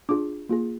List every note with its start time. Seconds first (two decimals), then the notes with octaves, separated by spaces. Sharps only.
0.09 D4 F4 G#4 D6
0.49 A#3 F4 G#4